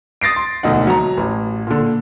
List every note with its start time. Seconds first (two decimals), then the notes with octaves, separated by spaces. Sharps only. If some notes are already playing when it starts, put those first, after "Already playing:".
0.21 D#6 A6 A#6 C7 D7
0.36 C6
0.63 E1 D2 D#4 F#5
0.87 F#3 A#5
1.17 A1
1.67 A#2 D3